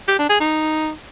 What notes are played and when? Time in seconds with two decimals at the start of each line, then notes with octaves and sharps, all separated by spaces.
0.08 G4
0.19 D4
0.30 G#4
0.40 D#4